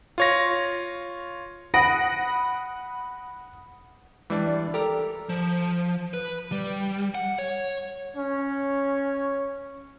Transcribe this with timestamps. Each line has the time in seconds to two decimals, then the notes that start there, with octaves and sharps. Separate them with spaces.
0.18 F4 C#5 A#6
1.74 F#5 B5 D#6 A#6 D7 D#7
4.30 E3 G3 G#3 D4
4.47 D5
4.74 G4 A4 A#4
5.29 F3
6.14 B4
6.52 G3
7.15 F#5
7.39 C#5
8.16 C#4 C#5